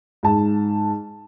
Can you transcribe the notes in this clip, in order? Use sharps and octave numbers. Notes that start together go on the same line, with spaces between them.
G#2 A5